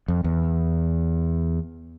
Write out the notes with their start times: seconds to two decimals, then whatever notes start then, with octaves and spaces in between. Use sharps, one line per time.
0.08 F2
0.24 E2